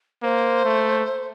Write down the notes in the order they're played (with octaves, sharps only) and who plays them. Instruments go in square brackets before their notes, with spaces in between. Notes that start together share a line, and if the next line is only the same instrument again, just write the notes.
[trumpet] A#3 [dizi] C5
[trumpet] A3